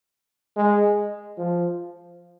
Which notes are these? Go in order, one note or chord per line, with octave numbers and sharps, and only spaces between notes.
G#3
F3